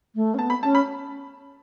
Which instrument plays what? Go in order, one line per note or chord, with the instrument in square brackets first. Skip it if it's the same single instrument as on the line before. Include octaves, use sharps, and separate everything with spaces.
[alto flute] A3
C#4
[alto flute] B3 [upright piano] A5
[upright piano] B5
[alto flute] C#4 [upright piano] A5
[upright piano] B5